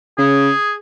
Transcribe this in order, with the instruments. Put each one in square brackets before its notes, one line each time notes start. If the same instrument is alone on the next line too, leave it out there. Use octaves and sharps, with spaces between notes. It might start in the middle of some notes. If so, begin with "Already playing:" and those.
[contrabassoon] C#3 [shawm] G#4